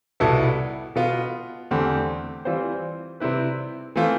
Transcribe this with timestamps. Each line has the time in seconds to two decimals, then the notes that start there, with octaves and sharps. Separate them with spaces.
0.20 C2 B2 B3 E4 A4
0.96 B2 B3 F4
1.71 E2 D3 A3 C4 G4
2.45 E3 G3 C4 F4 C5
3.20 C3 G3 C4 E4 B4
3.96 E3 A3 C4 F4